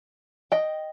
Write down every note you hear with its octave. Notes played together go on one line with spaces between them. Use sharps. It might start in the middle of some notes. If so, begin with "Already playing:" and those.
D#5 G5